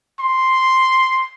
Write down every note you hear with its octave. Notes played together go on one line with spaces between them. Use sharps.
C6